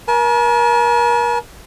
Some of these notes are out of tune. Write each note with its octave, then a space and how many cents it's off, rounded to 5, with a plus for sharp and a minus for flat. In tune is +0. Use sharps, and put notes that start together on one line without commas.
A#4 +35 A5 -45